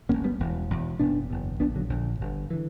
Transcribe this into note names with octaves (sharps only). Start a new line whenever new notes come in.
G1 G2 D3 A#3 C#4
G3 B3
E1 E2 B2
E1 E2 B2
F#1 E2 B2 B3 D4
F#1 E2 B2
A#1 A#2 B3 D4
D3 F#3
A#1 A#2 D3
G1 G2 D3
D3 E3